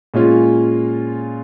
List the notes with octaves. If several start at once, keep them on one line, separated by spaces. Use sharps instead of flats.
A#2 G#3 C#4 F4